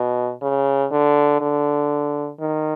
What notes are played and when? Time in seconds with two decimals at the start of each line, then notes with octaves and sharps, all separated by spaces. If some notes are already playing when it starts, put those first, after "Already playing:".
Already playing: B2
0.42 C#3
0.92 D3
1.41 D3
2.40 D#3